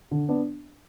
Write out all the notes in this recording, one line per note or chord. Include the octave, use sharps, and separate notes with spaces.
D3
B3 D4